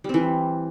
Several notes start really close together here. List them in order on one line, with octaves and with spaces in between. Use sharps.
G3 C4 E3